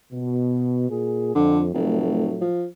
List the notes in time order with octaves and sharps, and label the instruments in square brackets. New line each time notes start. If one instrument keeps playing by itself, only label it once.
[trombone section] B2
A#2 G#4
[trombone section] F2 [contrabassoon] D3
[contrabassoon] F1 [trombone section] A2 F#3 A3
[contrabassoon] F3